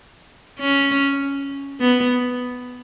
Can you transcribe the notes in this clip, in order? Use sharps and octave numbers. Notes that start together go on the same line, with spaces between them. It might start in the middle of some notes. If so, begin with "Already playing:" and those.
C#4
B3